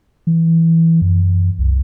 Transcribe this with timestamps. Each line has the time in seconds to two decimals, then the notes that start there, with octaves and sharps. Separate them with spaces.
0.27 E3
1.02 F#2
1.59 C2